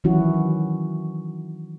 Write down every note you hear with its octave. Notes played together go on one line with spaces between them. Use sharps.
D#3 E3 F#3 C#4 E4 F#4